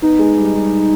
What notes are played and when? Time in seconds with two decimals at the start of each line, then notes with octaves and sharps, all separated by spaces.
0.02 B3 D#4
0.19 G#3
0.37 G3
0.55 G3